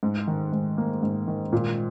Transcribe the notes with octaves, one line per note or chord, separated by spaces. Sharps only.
G#2
D#3
G#2
A#3
G#2
D#3
A#2